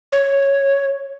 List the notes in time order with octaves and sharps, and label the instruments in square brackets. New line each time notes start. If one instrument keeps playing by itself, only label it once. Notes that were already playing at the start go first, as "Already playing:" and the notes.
[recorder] C#5